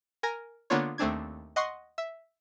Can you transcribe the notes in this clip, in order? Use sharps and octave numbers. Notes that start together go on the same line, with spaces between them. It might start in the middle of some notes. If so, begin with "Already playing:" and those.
A#4 G#5 A#5
D3 A#3 B3 D4 F4 C#5
D#2 A3 C4 D4 G#6
D#5 F#5 C6 C#6 C7
E5